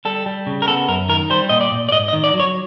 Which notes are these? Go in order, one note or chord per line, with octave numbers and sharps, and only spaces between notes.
G3 A4
G3
C#3
A#4
B3 A4
F#2 A#4
D#3 A#4
G3 C5
A#2 D#5
D5
A#2
D5
G#2 D#5
D#5
D#3
D5
F#3
C#5